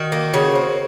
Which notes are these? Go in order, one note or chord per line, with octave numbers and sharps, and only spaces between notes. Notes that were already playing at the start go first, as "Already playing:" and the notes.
Already playing: D#3 F#4
A#3
C#3 F#4
C4